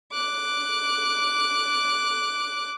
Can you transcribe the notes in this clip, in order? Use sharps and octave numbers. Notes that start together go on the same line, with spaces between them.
D6 F#6